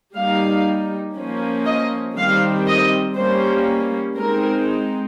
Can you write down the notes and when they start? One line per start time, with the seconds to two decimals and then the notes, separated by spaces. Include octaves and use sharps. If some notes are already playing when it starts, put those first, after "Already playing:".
0.15 G3 A#3 D#4 F5
1.17 F3 A#3 C#4
1.66 D#5
2.16 D#3 G3 C4 F5
2.66 D#5
3.16 G3 A#3 C#4 C5
4.17 G#3 C4 D#4 A#4